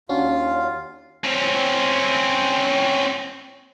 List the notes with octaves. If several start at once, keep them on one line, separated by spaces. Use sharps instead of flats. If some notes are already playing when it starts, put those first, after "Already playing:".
D#2 C#4 D4 F4 F#4 F5
C4 C#4